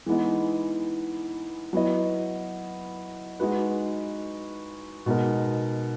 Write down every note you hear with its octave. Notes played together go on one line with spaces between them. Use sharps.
E3 G#3 B3 D#4
F#3 B3 E4 B4 D#5
G#3 D#4 F#4 B4
B2 G#3 D#4 A#4